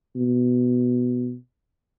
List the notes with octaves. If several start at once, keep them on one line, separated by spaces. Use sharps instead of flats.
B2